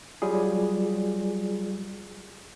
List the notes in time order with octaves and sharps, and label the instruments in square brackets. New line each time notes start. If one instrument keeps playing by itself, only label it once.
[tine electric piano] F#3 G3 F4 G#4